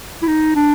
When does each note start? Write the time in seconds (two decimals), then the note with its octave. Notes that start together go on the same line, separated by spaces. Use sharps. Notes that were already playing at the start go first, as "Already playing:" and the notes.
0.22 E4
0.28 D#4
0.56 D4